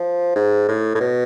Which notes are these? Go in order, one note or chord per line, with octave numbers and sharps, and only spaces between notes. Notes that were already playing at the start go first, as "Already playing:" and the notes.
Already playing: F3
G#2
A2
A2
B2